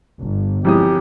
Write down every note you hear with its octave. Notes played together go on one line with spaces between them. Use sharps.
G1
E1 C#2 F3 C4 E4 G4 D#6